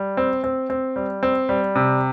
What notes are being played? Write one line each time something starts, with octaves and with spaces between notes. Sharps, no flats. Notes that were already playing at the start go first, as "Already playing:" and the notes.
Already playing: G3
C4
C4
C4
G3
C4
G3
C3